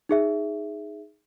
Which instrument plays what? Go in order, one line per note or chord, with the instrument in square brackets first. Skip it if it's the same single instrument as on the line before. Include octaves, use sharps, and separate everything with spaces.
[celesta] D#4 G#4 E5